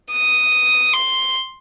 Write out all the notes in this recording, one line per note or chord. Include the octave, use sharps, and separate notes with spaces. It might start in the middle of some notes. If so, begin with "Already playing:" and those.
D#6
C6